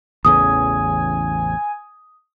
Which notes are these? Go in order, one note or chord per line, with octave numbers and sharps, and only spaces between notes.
A1 E2 C#3 G#5 D#6